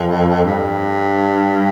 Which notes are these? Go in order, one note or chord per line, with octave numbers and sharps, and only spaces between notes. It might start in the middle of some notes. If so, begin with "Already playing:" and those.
Already playing: F2
G2